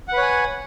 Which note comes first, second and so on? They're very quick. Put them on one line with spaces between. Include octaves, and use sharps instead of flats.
F#5 B4 C#5 G#5